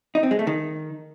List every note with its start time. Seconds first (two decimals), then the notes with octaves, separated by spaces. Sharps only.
0.15 D#4
0.23 C4
0.31 G#3
0.39 A3
0.47 D#3